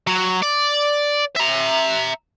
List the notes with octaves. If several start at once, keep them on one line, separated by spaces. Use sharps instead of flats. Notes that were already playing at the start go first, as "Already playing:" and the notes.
F#3
D5
E5 A#5